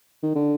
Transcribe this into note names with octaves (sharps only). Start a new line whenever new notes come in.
D#3
D3